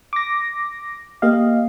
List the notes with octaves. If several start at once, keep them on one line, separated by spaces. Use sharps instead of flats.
D6 A#6
A#3 G4 D#5 F5